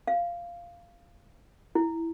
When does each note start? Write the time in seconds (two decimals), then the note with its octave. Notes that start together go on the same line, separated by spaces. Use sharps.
0.07 F5
1.75 E4